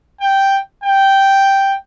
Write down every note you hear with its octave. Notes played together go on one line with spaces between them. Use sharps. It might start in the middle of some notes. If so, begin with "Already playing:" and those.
G5
G5